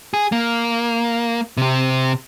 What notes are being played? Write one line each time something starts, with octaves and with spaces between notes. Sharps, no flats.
G#4
A#3
C3 C4